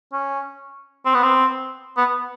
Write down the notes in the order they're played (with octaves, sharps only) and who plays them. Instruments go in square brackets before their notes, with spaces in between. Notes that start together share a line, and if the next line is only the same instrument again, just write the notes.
[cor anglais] C#4
C4
B3
C4
B3